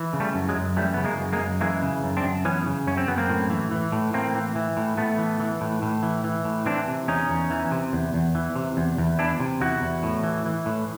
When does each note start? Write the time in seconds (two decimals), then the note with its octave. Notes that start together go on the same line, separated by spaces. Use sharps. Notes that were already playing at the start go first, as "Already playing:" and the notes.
Already playing: E3
0.13 C#3
0.20 G3 A3
0.35 F#2
0.49 F#3 G#3
0.56 F#2
0.76 E3 G3 A3
0.94 C#3 B3
1.05 G#3 A#3
1.19 F#2
1.33 G#3 A#3
1.40 F#2
1.61 E3 G#3 A#3
1.82 C#3
2.03 F#2
2.17 C4 D4
2.24 F#2
2.45 E3 B3 C#4
2.66 C#3
2.87 F#2 C#4
2.97 C4
3.08 F#2 B3
3.18 A#3 C4
3.29 A2
3.50 E3
3.71 E3
3.92 A2
4.13 A2 A#3 C4
4.35 E3
4.56 E3
4.77 A2
4.97 A2 A3 B3
5.18 E3
5.40 E3
5.61 A2
5.82 A2
6.03 E3
6.24 E3
6.45 A2
6.66 E3 C4 D4
6.87 C3
7.08 E2 C#4 D#4
7.30 E2
7.51 E3
7.71 C3
7.93 E2
8.14 E2
8.35 E3
8.56 C3
8.77 E2
8.98 E2
9.19 E3 D4 E4
9.40 C3
9.61 E2 E4 F#4
9.82 E2
10.03 A2
10.24 E3
10.46 E3
10.66 A2